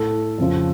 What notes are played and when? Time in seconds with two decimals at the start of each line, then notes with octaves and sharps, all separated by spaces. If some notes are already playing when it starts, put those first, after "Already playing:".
Already playing: A2 A3 A4
0.38 F2 C#3 F3